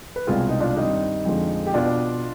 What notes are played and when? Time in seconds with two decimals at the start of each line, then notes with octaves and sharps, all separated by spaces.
0.16 B4
0.27 C2 B2 G#3 C4 F4 G#4
0.49 D#4
0.60 D4 F4
0.77 G2 D#3 G3 C4 D#4
1.25 F2 D3 F3 G#3 C4
1.66 G4
1.74 B2 B3 D4 F4